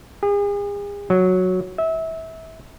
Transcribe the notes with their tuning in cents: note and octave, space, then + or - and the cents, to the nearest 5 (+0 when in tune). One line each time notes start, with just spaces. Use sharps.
G#4 -40
F#3 -5
E5 -25